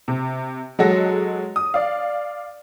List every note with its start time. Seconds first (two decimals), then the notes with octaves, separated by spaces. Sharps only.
0.08 C3
0.79 F#3 G#3 F#4 A4 A#6
1.56 D#6
1.74 D5 F5